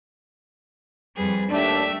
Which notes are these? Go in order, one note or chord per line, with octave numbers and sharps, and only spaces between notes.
F2 G3 G#4 B4
D#2 A3 D4 G4 E5